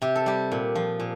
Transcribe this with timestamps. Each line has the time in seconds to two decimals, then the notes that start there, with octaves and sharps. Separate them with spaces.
0.02 C3 G4
0.15 A4
0.26 G3 G4
0.52 A#2
0.75 F3
1.00 A#2